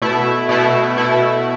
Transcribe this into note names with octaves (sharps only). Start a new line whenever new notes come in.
B2 A3 E4
B2 A3 E4
B2 A3 E4